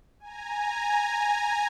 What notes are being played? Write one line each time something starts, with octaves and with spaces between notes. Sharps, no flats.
G#5 A#5